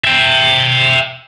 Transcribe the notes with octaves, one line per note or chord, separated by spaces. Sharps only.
E5 G5